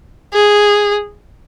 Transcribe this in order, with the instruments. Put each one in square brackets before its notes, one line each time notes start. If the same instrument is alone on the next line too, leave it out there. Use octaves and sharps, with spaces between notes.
[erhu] G#4